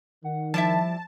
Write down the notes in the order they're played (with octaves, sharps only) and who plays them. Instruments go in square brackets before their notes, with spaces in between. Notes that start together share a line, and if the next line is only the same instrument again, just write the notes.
[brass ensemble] D#3 [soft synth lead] F#5
[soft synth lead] F3 [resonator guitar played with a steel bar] G3 E4 E5 [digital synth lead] A5